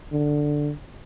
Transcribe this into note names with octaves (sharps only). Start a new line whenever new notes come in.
D3